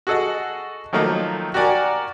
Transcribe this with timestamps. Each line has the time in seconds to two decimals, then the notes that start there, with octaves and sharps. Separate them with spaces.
0.07 F#4 G#4 A4 D#5 F#5
0.93 D#3 F3 F#3 A3 A#3 D#4
1.54 F#4 G4 A#4 D5 F#5 G#5